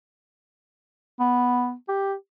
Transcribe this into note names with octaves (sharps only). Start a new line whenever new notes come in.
B3
G4